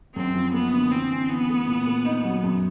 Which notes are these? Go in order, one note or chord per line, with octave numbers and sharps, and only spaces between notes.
F#2 C4
F3
A#3 B3
D3
E3 C4
C#4
E3 B3
A3
A#2
A#3
D#4
F#3
F#2